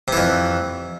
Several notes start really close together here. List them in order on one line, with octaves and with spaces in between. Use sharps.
C3 E3 F2